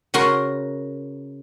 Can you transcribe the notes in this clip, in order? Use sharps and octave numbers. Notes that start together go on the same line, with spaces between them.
C#3 F#4 A#4 C6